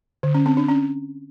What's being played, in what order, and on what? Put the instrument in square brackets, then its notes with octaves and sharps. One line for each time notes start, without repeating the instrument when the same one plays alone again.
[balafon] D3
C#4
C4
D4
C#4